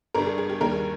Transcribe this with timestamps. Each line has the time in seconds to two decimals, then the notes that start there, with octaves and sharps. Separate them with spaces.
0.14 G1 G2 G3 A#4
0.26 G#4
0.38 G#4
0.50 G4
0.61 D#2 D#3 G3 A#4
0.72 G#4